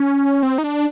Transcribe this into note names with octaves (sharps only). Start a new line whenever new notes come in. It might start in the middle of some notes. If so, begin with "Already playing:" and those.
Already playing: C#4
C4
D#4
D4